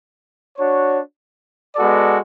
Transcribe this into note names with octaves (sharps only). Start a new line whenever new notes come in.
D4 F#4 C#5
G#3 B3 F#4 A4 D5